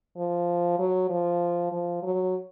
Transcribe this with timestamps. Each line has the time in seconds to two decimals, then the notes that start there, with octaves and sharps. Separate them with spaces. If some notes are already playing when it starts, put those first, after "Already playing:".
0.17 F3
0.79 F#3
1.10 F3
1.72 F3
2.02 F#3